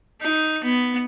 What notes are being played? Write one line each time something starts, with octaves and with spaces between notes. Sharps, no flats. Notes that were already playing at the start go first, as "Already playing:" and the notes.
D#4
B3